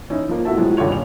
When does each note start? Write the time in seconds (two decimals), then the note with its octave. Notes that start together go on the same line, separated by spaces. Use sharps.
0.10 E3 C#4 D#4 E4
0.29 F3 A#3
0.45 B2 A3 E4 F#4 E5 A5
0.57 A2 F3 F#3 G#3
0.77 G2 D3 F4 G4 C#5 F7
0.90 D#1 C#5 F7